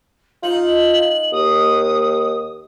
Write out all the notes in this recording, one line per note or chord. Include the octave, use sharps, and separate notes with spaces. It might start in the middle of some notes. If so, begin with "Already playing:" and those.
D#4 F4 F#7
D#2 D#6